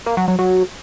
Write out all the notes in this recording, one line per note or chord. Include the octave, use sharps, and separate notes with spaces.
A#3
F#3
F#3
F#3